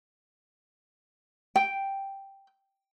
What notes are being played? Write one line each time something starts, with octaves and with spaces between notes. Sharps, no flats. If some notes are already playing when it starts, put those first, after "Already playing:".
G5